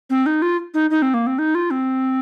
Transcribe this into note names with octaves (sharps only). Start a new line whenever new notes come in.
C4
D#4
F4
D#4
D#4
C4
A#3
C4
D#4
F4
C4